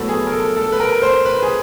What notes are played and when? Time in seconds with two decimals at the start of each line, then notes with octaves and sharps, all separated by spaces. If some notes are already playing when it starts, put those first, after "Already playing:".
Already playing: A2 F#3 B3 A4
0.09 G#4
0.26 A#4
0.32 A4
0.57 A4
0.72 B4
0.80 A#4
1.02 C5
1.25 B4
1.43 G#4